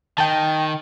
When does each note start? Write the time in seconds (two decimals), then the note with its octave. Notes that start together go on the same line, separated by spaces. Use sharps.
0.18 D#3 G5 A5